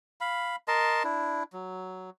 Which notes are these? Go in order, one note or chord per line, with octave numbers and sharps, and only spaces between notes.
F5 B5
A#4 D#5 A5 C6
D4 E4
F#3